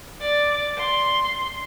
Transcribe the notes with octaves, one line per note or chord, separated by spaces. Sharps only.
D5
C6